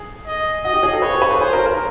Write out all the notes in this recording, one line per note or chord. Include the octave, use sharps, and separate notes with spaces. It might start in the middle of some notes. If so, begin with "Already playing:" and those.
Already playing: G#4
D#5
F#4 D#5
G4
G#4
A4
B4 C#5
C5
B4
A4
G#4 C5
A#4
A#4